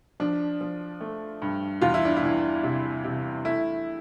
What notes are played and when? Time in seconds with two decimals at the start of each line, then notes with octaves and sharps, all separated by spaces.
0.20 F3 D4
0.61 F3
1.01 A3
1.42 G2
1.81 E2 F4
1.94 E4
2.05 D4
2.16 E4
2.23 E3
2.63 C3
3.04 C3
3.45 A3 E4